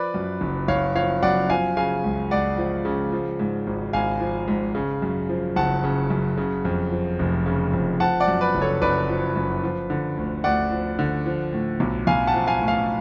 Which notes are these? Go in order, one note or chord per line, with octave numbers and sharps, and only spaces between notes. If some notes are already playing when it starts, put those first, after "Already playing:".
Already playing: F3 B4 D5
F#2
F#1
F#1 C#5 F5
F3 C#5 F5
F#2 D5 F#5
F3 F5 G#5
C#3 F5 G#5
C#2
C#2 D5 F#5
F3
C#3
F3
G#2
G#1
G#1 F5 G#5
F3
G#2
C#3
F#2
F3
F#1 F#5 A5
C#3
F#2
C#3
F2
F3
F1
C#3
F2
F3 F#5 A5
D5 F#5
F#2
B4 D5
F#1
A4 C#5
F#1 B4 D5
F3
F#2
F3
D3
D2
D2 D5 F#5
F3
D3
F3
A2
B1
B1 F5 G#5
F#5 A5
F3
F5 G#5
A2
F5 G#5